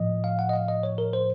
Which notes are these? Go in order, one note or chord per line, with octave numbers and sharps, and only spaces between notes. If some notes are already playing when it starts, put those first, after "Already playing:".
Already playing: A2 F3 D#5
F5
F#5
D#5
F5
D#5
C#5
A#4
C5